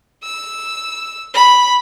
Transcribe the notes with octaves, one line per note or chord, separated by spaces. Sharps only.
E6
B5